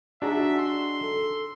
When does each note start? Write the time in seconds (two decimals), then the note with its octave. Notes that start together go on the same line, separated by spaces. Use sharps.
0.22 D4 D#4 F#4 G#4 E5 A#5
0.59 C6
1.02 A4